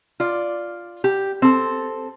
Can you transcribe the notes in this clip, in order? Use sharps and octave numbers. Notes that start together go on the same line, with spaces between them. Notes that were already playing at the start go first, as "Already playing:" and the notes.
F4 D5
G4
C4 A4